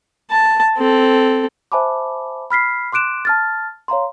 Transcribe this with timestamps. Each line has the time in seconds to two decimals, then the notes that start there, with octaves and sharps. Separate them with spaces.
0.30 A5
0.78 C4 A4
1.72 C5 E5 G#5 A5 B5 D6
2.50 B5 F6 B6 C7
2.92 C6 D6 F#6 D7 E7
3.25 A5 F6 A6
3.88 C#5 F5 A#5 C6